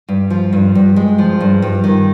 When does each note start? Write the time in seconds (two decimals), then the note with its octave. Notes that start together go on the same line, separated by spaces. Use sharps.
0.08 G2
0.30 F3
0.53 G2
0.75 G2
0.96 G#3
1.19 F3
1.40 G2
1.62 G2
1.84 D#3